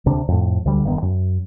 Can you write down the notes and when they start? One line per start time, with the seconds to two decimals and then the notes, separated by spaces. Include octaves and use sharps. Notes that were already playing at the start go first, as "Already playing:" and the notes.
0.06 D2 C3 D4
0.28 F2 A2
0.65 D2 D3 G3
0.85 F1 G2 D#3 B3
1.02 F#2